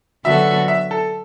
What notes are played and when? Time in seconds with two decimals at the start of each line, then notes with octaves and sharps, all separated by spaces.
0.25 D3 F#3 B3 F#4 A4 E5
0.68 E5
0.91 A4